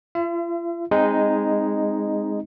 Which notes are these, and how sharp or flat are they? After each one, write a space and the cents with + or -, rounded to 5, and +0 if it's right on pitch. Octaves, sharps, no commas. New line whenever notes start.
F4 -40 E5 +40
G#3 -10 C4 +10 D#4 +0